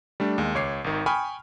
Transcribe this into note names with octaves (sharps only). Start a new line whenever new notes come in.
G3 A3 D4
D#2 G#3
C#2 C#5 D6 C7
G#1 D#3
G5 G#5 B5 C#6 D#6 F6